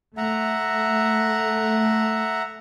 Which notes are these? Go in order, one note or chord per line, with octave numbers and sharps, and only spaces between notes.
A3 E5 F#5 A#5